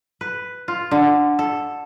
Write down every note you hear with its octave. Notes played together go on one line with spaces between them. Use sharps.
B4
F4
D3
A4